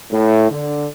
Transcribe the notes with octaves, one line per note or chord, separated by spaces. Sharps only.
A2
D3